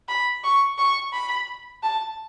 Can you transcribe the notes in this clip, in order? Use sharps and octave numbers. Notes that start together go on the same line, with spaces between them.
B5
C#6
C#6
B5
A5